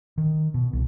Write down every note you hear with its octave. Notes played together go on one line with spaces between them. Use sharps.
D#3
B2
C2